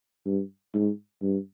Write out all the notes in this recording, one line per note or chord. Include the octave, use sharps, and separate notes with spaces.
G2
G#2
G2